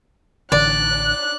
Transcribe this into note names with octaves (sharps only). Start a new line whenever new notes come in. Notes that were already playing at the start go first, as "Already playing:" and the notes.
A1 D3 E3 D5 F#6